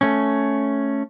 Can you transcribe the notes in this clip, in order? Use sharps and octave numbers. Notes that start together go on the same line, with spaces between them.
A3 C#4